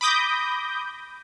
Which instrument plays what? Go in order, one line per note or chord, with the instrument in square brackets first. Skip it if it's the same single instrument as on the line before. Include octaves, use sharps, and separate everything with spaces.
[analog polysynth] B5 D6 D#6 G6 A#6